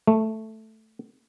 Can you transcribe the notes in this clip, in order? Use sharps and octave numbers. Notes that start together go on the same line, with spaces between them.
A3